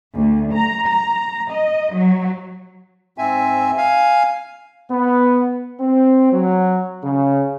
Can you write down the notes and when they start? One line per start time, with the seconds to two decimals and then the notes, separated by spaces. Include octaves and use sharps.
0.14 D2
0.54 A#5
0.88 A#5
1.52 D#5
1.93 F#3
3.18 G#2 C4 E5 G#5
3.77 F5 G#5
4.90 B3
5.80 C4
6.33 F#3
7.03 C#3